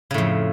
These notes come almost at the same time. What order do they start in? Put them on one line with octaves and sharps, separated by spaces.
C#3 A2 F2